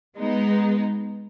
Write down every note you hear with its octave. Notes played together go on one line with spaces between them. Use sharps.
G#3 B3 D#4